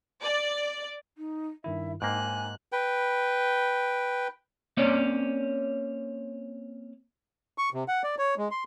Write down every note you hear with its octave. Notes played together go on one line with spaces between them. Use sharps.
D5
D#4
G2 D#3 E4 E5
G#2 A#3 G5 G#5 F#6
B4 G5
A#3 C4 C#4 C#5 D5
C#6
C3
F#5
D5
C#5
G#3
C6